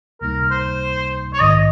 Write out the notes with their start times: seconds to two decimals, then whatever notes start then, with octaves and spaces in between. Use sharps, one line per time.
0.21 C#2 C3 G3 A#3 D#4 A#4
0.51 C5
1.33 C#5
1.41 A#1 G#2 D#3 D#5